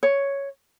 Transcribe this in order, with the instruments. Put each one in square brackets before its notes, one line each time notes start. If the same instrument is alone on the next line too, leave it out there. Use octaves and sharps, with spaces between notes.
[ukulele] C#5